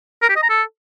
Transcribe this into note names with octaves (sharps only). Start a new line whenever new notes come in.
A#4
G4
D#5
A#5
A4